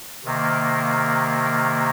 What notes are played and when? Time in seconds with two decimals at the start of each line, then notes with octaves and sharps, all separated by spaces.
0.24 C3 D#3 A#3